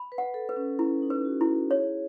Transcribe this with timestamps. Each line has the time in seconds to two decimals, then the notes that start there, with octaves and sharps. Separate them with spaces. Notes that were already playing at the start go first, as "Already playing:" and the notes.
Already playing: B5
0.12 B4
0.18 F#5
0.34 A4
0.49 B4
0.57 C#4
0.79 C#4 E4
1.02 D#4
1.10 B4
1.25 F#4
1.41 E4
1.48 F#4
1.71 G#4 C#5